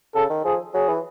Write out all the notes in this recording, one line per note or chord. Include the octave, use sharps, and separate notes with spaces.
C#3 A4
D#3
F3 G#4
F#3 G#4
E3